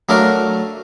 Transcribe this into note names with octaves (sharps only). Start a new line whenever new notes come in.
F#3 A3 D4 A#4 F5